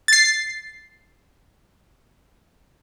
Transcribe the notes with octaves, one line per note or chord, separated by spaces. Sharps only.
A6 C7